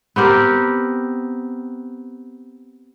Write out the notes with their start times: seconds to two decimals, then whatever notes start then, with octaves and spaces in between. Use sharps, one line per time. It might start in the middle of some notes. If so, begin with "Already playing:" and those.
0.16 B3 C4 G4 A#4